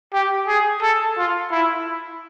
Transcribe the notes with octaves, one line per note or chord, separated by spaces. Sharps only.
G4
G#4
A4
F4
E4